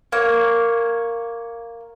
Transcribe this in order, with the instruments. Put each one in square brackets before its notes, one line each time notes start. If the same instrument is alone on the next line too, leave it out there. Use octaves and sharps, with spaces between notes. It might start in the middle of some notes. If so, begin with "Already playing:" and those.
[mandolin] A#3 C#5